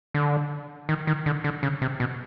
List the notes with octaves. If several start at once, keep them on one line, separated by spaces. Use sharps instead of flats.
D3
D#3
D#3
D3
D3
C#3
C3
B2